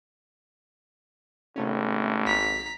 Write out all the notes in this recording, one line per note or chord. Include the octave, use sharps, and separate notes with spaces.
G#1 C3 A3 C#4
B1 A#5 B6